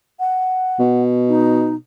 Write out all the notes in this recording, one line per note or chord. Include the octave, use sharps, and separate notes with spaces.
F#5
B2
D#4